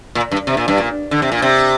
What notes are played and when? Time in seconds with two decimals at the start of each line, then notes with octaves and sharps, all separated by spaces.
0.15 A#2
0.31 G2
0.47 C3
0.57 A#2
0.68 G2
0.78 A#2
1.11 D3
1.22 C3
1.32 A#2
1.42 C3